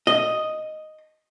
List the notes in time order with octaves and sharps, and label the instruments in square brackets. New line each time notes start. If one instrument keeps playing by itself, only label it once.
[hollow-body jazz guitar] D#5